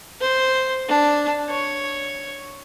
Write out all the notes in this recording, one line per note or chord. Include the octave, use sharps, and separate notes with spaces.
C5
D4
C#5